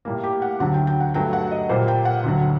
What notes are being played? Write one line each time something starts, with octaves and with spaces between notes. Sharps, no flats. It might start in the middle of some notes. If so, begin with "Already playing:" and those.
A2 G3 A#3
G4
F#5
D2 D3 F#3 F#5
G5
G5
F#5
G2 F#3 A3 G5
F#5
D#5
A#2 G3 A#3 C5
G5
F#5
D2 D3 F#3